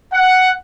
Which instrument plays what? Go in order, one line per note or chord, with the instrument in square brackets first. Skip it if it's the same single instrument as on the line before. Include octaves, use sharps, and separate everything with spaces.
[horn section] F#5